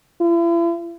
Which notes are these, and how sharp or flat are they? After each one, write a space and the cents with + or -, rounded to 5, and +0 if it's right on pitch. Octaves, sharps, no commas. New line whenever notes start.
E4 +45